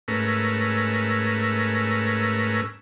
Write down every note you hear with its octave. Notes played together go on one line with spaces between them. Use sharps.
G#2 A3 C#4 A#4 B4 E6